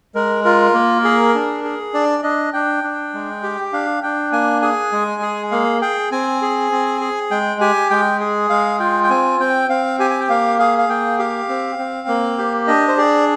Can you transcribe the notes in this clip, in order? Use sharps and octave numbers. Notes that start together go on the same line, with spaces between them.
G#3 A#4
F4 A#4
A#3
G#4
D4
G#4
D4 D5
D4 D#5
D4 G5
D4
G#3
G4
D4 F5
D4 G5
A#3 G#5
G#4 G#5
G#3
G#4
A#3 F5
G#4 G5
C4 G#5
G#4
C4
G#4
G#3 G5
G4 G#5
G#3 G5
G#4
G#3 F5
F4 G5
G5
C4 G#5
C4 G5
C4 F5
G4 G#5
G#5
G5
A#3 F5
G#4 F5
F5
A#3 G5
G4 F5
C4
C4
A#3
G4
D4 D#5
C5
G#4 D5